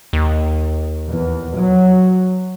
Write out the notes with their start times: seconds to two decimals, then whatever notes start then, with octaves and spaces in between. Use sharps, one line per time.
0.13 D#2
1.07 E2
1.54 F#3